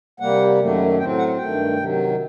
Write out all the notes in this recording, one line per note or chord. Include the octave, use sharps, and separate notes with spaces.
C3 G3 A#3 F#5
F#2 D#3 F#3 A3
A2 F#3 C4 G5
F#5
G2 D#3 A3 G5
C3 D#3 F#3